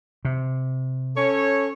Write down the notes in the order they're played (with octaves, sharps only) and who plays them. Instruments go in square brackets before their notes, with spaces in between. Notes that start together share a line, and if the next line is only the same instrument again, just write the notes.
[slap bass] C3
[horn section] C#4 A4 C#5